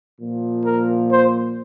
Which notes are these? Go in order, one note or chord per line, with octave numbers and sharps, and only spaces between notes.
A#2 F3
A#4
C5